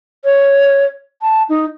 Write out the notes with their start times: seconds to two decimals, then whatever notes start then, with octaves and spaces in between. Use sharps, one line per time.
0.25 C#5
1.22 A5
1.49 D#4